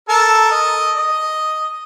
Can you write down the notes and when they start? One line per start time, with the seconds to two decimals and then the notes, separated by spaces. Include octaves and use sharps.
0.09 A4 A#4 A5
0.51 D#5
0.96 D#5